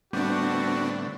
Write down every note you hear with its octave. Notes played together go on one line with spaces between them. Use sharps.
A2 D3 G3 B3 C4 D4 F#4